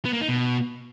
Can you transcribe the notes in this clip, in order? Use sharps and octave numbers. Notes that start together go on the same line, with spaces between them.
B3
A#3
D#4
B2